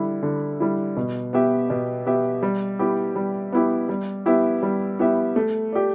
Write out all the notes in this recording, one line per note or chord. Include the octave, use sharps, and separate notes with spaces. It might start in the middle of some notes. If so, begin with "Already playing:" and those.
Already playing: D3 G3 E4
D3
G3 E4
B2
B3 G4 E5
B2
B3 G4 E5
G3
B3 E4 G4
G3
B3 E4 G4
G3
B3 E4 G4 E5
G3
B3 E4 G4 E5
A3
G4 D5